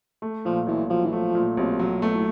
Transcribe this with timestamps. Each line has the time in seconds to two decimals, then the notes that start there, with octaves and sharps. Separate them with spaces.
0.22 A3
0.45 A#2 F3
0.67 B1 E3
0.90 F3 F#3
1.05 E3
1.13 F3 A3
1.35 A#2
1.57 B1 C3
1.79 F#3
2.02 B2 A3
2.15 A2